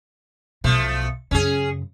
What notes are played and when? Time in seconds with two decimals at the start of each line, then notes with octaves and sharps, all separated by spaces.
0.64 B1 B2 F3 A3
1.31 F#2 C#3 C#4 G#4